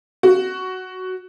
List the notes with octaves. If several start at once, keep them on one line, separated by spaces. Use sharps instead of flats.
F#4